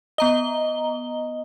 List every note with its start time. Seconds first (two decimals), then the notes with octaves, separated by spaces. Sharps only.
0.18 B3 D#5 A#5 G7